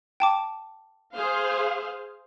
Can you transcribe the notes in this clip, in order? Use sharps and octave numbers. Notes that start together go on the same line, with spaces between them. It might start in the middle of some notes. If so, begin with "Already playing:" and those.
G5 A5 D6
G#4 C5 F5